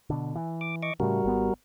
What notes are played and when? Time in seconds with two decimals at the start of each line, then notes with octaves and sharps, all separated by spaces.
0.10 B2 D3
0.35 E3
0.61 D6
0.83 D#5 C#6 D6
1.00 A2 C#3 G3 F#4 A#4
1.24 G#1 B3